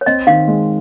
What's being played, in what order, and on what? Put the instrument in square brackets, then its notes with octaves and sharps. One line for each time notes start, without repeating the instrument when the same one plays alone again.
[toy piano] C#5
[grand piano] C4 [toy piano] D#5
[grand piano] D#3 [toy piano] F5
[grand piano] G#3